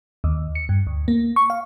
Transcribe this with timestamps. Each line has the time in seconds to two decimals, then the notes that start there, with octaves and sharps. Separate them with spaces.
0.24 D#2
0.55 C#7
0.69 G2
0.87 D2
1.08 A#3
1.36 C#6
1.50 F5